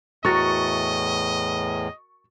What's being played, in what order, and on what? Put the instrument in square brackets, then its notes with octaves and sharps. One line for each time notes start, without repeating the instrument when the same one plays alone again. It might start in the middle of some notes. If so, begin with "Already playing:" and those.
[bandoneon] E2 A2 [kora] F#4 A#4 [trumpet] D#5 [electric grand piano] C#6 A6